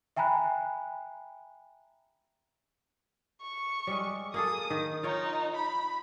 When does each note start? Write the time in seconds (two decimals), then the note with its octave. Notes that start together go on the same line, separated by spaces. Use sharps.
0.17 E5 G5 G#5 A#5 B5 F#6
3.41 C#6
3.87 G3 G#3
4.34 A#3 G#4 A4 D#6
4.70 D#3
5.03 D#4 F4 C#5 G5
5.56 B5